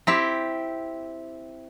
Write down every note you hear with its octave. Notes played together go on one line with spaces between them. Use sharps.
C4 E4 G4